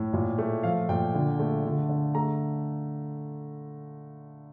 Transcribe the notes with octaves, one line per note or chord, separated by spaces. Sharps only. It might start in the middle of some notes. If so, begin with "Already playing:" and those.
Already playing: A2
A#2
A3
F3 F5
A#2 G5
D3
A3
D3
D3
A3 A#5